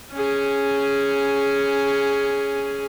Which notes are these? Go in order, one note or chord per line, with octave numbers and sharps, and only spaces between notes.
C#4 G#4